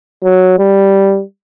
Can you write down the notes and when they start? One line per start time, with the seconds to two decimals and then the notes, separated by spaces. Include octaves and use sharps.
0.23 F#3
0.59 G3